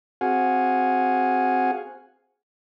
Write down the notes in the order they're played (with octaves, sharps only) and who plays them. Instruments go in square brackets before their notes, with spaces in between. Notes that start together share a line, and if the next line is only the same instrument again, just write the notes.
[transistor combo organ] C4 F#4 G#4 F5 F#5 G#5